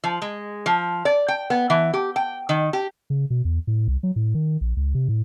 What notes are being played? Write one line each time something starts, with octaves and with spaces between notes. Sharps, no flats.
F3
G#3
F3
D5
G5
B3
E3
G4
G5
D#3
G4
C#3
B2
E2
A2
C2
F#3
A2
D#3
A#1
C#2
C3
A2